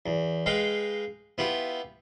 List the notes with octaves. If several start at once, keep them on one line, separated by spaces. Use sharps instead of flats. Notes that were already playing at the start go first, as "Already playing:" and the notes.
E2
G#3 B4 F5 G5
B3 E4 F4 G4